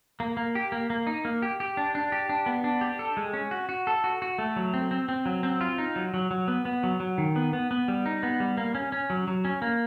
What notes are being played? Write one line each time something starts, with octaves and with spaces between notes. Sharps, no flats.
A#3
A#3
G4
A#3
A#3
D#4
A#3
G4
G4
D4
D4
G4
D4
B3
D4
G4
A4
G#3
C#4
F#4
F#4
A4
F#4
F#4
A3
F#3
C4
C4
C4
F#3
C4
F4
D#4
F#3
F#3
F#3
B3
B3
F#3
F#3
D#3
B3
B3
B3
G3
D#4
B3
G3
A#3
C#4
C#4
F#3
F#3
C#4
A#3